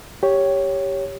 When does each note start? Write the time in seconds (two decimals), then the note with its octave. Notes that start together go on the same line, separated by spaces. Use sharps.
0.23 G4 C#5